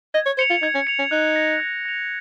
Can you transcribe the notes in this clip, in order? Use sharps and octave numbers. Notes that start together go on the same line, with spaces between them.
D#5 G#6
C#5
C5 C#7 F7
F4
D#4 G#6
C#4
C#7 F7
C#4
D#4 F#6
A#6 F7
F#6
A#6 F7